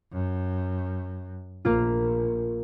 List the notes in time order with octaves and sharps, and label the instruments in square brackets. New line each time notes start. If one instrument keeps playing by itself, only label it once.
[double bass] F#2
[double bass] A#1 [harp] A#3 F4